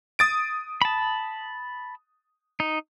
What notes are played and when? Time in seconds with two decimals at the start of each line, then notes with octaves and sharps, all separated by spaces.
0.19 D#6 A6 D7
0.82 A5 B5
2.60 D#4